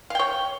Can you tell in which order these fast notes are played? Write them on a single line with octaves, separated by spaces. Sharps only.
F5 G5 C#5